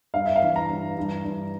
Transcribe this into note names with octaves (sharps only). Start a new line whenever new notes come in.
G2 F5
E5
F5
E3
A#5
G2
G2
G2